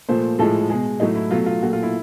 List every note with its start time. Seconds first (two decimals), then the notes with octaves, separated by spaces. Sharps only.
0.09 A#2 F3 A3 C5
0.39 A2 F3 G#3 A4
0.70 B2 G#3 G#4
1.00 A2 F#3 A3 D#4
1.15 E4
1.31 B2 F#3 A3 F4
1.46 F4
1.63 A#2 F#3 A3 F#4
1.73 F4
1.83 E4